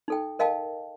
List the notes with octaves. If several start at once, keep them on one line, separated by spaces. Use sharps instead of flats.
D#4 A4 G5
A#4 D#5 F5 G5 A5